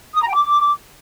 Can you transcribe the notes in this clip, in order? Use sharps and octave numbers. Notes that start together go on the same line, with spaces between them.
D#6
A#5
G5
D6